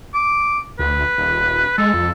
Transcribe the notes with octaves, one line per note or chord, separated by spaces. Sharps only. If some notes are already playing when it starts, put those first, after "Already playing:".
D6
D2 B4
D#1
G#3 A4
F2